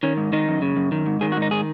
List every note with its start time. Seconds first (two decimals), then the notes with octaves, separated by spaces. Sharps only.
0.03 D#3 C#4
0.17 G#2
0.33 D#3 D#4
0.48 F#2
0.62 C#3
0.76 F#2
0.92 D#3
1.06 G#2
1.21 D#3 G#4
1.32 F#4
1.37 G#2
1.42 D#4
1.51 D#3 G#4